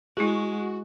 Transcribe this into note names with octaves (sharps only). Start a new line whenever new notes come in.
G#3 E4 F#4 G#4